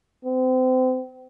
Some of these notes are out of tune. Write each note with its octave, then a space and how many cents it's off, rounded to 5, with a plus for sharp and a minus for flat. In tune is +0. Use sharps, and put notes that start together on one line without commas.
C4 -30